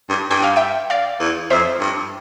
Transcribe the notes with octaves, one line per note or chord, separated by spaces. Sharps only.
G2
G2 G5
F5
E5 G5
D5 F5
E2
F2 C5 E5
G2